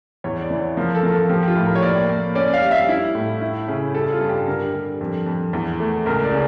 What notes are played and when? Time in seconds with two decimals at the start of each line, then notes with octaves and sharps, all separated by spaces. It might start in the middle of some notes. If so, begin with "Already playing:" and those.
0.24 E2 C#5
0.41 D5
0.50 E3
0.59 C#5
0.77 F3 A#4
0.95 A4
1.03 F3 A#4
1.12 A4
1.30 F3 G4
1.43 G4
1.48 F4
1.56 A2
1.66 A#4
1.75 C#5
1.82 A#3 D5
2.09 A#3
2.35 C#4 D5
2.54 F5
2.62 G3
2.71 E5
2.89 E4
3.15 A2
3.41 E4
3.68 C#3
3.94 G3 A4
4.12 F4
4.21 G2
4.29 G4
4.47 D3 A#4
4.74 G3
5.01 F2
5.26 F2
5.53 E2
5.80 A3
6.06 C#2 A#4
6.24 D5
6.32 C#3